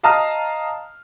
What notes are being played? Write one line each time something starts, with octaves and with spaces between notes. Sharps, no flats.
D#5 F5 A5 A#5 D#6 F6